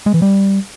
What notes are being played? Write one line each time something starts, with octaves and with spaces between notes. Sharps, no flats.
G#3
E3
G3